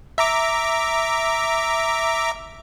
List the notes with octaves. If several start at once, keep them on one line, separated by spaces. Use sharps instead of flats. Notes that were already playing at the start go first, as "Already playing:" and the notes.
E5 A#5 D6